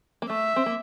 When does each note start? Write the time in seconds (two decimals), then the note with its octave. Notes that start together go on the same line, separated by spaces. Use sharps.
0.22 A#3
0.30 A3 E5
0.56 C4
0.66 A#3